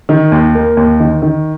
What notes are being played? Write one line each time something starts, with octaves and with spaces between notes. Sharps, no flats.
D#3
D#2
A#3
D#2
D#3
D#3